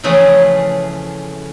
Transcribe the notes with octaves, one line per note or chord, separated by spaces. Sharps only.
C#3 E3 F3 A3 C#4 G#4